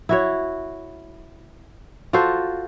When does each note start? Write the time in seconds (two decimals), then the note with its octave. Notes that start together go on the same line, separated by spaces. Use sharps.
0.09 E4 F#4 C#5
2.13 F4 F#4 A4 C5